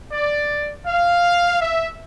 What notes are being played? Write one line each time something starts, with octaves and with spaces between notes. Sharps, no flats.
D5
F5
E5